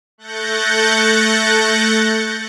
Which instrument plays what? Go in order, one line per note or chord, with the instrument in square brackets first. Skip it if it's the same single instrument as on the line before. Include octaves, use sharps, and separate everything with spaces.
[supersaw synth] A3 F#6 G6 A6 A#6 C#7